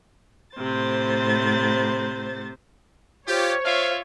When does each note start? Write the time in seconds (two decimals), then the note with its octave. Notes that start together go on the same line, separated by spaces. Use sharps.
0.56 A2 C3 C5 A6
3.28 F4 G4 C5 C#5
3.64 F4 E5 F5